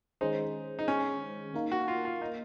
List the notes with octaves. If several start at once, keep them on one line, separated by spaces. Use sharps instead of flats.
D#3 G#3 C#4 D#4 G#4 C5
D#4
C#4
A#3 D#4 A#4 F5
F#4
F4
F4
D#4